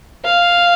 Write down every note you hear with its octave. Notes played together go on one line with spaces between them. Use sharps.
F5